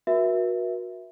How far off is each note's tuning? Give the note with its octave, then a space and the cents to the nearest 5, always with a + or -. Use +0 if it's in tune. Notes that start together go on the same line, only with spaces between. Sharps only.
F#4 -20 A#4 +45 E5 +0